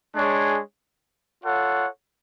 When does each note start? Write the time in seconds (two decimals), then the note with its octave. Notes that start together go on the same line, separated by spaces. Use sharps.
0.15 G#3 D4 G#4 C#5
1.43 F4 A4 C#5 F#5